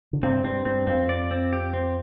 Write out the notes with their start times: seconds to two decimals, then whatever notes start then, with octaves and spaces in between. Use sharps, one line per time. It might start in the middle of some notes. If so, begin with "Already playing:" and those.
0.13 D3
0.23 G2 C3 C4
0.44 G2 C4
0.65 G2 C4
0.87 F2 C4
1.09 D5
1.31 C4
1.53 G4
1.74 C4